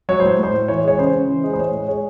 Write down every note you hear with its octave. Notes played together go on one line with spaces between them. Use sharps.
F#3 C#5
A2 C5
A2 C5
A2
E3 C#5
G#3 C#5
C#3 C5
C#3
E3
G#3
C5
A2 C#5
G#3
G#3 C#5